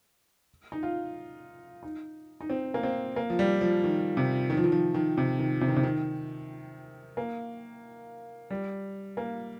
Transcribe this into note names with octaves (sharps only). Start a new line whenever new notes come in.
D#4
F4
D#4
D#4
C4
A#3
C4
A#3
F3
G3
F3
D#3
C3
D#3
F3
D#3
F3
D#3
C3
D#3
C3
D#3
C3
D#3
A#3
G3
A#3